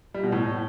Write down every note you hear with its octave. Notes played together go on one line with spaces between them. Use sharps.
G3
B2
A2